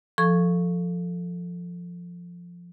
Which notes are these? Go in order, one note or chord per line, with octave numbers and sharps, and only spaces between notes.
F3 A4 C#6